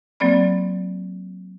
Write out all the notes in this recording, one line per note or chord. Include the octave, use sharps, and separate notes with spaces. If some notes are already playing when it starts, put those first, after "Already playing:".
F#3 A#3 C4 D5 B5